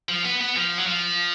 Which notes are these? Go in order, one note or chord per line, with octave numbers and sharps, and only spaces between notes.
F3
B3
B3
F3
F#3
F3